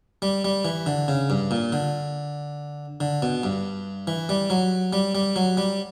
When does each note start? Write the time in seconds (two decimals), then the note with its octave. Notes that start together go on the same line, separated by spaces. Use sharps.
0.22 G3
0.44 G3
0.65 E3
0.86 D3
1.08 C#3
1.30 G2
1.51 A#2
1.72 D3
3.00 D3
3.22 B2
3.43 G2
4.07 E3
4.29 G3
4.50 F#3
4.93 G3
5.15 G3
5.36 F#3
5.57 G3